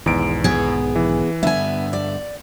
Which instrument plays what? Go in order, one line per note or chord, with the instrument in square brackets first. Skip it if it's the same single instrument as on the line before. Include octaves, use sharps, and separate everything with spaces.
[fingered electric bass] B1 G#2 D#3 [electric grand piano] E2 D7
[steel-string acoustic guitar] B3 G#4
[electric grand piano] E3
[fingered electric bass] G2 D3 [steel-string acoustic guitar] B3 G#5 [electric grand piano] E5
[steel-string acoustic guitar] D5